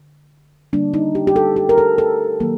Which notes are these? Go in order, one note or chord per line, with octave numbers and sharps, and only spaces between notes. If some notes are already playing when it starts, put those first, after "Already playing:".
Already playing: D3
D3 G3 A#3 D4
D#4
G4
G4
A4
G4
A#4
A4
A4
D#3 F#3 A#3